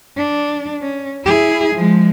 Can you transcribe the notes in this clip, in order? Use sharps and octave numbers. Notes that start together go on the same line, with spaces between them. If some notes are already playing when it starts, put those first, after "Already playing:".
D4
C#4
E4 G#4
F3 G#3